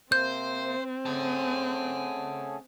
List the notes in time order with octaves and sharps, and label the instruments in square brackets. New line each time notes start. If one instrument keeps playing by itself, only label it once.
[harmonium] C3 A#3 [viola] C4 [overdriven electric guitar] C5 [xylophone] G6
[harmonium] A3 C#4 G#4 [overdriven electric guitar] F#5 A5